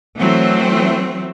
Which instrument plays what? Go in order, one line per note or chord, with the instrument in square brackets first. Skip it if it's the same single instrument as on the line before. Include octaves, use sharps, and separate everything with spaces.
[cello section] E3 F#3 A3 C4